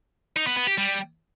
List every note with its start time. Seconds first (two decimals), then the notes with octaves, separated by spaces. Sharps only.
0.36 D#4
0.47 B3
0.57 B3
0.67 G4
0.78 G3